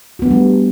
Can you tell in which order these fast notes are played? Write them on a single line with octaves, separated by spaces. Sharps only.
F#4 B3 D4 A3 G3